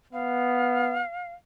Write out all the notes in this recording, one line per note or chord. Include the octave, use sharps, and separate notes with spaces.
B3 F5